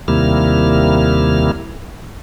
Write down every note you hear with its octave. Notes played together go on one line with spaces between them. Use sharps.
D#2 C3 G3 A#3 E4 F6